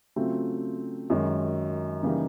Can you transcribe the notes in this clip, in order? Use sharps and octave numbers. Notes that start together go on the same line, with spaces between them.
C#3 F#3 A3 C4 F4
F#2 D#3 G#3
C#3 E3 G3 A#3 D#4